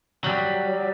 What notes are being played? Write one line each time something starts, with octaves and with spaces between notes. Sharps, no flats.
F#3 G3